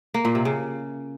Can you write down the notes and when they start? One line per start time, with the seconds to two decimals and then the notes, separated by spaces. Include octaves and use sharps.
0.14 A#3
0.25 A#2
0.35 C3
0.45 C#3